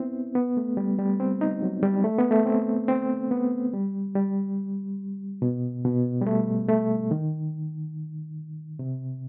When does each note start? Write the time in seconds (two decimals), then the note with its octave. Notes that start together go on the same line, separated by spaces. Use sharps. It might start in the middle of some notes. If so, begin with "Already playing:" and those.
Already playing: B3 C4 E4
0.35 B3
0.57 A3
0.77 G3
0.99 G3
1.20 C4
1.41 D#4
1.63 F#3
1.83 G3
2.04 A3
2.18 B3
2.31 A3
2.46 C4
2.88 C4
3.31 B3
3.74 G3
4.15 G3
5.42 B2
5.85 B2
6.21 G3
6.27 A3
6.68 A3
7.11 D#3
8.79 C3